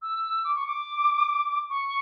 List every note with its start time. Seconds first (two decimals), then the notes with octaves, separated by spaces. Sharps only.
0.02 E6
0.44 D6
0.55 C#6
0.67 D6
1.70 C#6